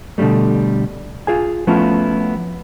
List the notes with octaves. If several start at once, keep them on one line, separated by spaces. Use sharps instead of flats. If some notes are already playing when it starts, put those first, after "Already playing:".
B2 D3 D#3 G3 A3
F4 G#4 G#5
F3 A3 B3 C#4 E4 F4